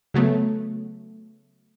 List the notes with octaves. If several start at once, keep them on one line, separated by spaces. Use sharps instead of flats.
C#3 F#3 A3 B3